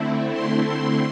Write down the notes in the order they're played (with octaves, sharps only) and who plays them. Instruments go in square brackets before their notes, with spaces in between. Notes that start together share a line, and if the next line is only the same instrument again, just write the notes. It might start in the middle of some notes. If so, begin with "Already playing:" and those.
Already playing: [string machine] D3 A3 C4 E4
C6
C6